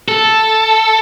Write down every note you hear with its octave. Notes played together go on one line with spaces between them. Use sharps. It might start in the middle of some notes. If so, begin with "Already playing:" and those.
A4